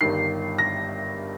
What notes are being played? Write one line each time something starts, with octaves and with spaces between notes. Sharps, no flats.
G1 G2 D#3 C7
A#6